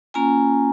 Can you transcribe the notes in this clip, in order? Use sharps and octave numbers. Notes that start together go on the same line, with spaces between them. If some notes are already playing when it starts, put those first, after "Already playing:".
A#3 C#4 F4 G#5 A#5